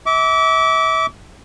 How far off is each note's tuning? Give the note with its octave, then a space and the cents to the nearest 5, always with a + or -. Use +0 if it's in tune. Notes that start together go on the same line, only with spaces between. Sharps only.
E5 -35 D6 -30